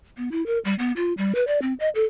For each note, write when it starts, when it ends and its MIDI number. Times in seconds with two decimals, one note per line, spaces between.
0.17 0.29 59
0.32 0.45 64
0.46 0.58 70
0.65 0.75 55
0.79 0.92 59
0.96 1.13 65
1.17 1.33 55
1.35 1.46 71
1.47 1.61 74
1.62 1.74 60
1.80 1.89 75
1.95 2.04 69